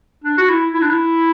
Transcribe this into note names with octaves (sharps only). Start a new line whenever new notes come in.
D4
F#4
E4
E4
D4
E4